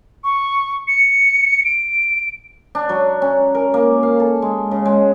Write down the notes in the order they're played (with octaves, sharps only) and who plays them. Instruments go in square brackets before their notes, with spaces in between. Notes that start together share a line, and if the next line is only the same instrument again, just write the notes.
[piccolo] C#6
C#7
D7
[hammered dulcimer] D4
F#3
C#4
A#4
A#3
F5
A4
G#3
C#3
G#3